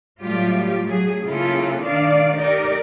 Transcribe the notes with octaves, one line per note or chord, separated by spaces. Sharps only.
A2 F#3 G3 A3 F4 G4
F#3 A3 G#4
C#3 A#3 E4 F4 A4
D#3 D4 D5 F5
D#4 G4 A#4 D5